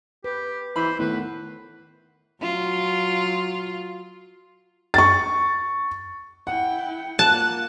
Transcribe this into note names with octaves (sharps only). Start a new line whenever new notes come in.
G4 B4
E3 C5 B5
A2 D#3 B3 B4
F#3 F4
C#6 A6
E4 F#5 G5
A#3 F4 A5 F#6